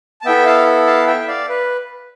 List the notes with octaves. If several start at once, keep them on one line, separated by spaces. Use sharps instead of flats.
A5
B3 E4 A4 E5 G5
F5 A5
F5 A5
E5 G5
E5
D5 F5
B4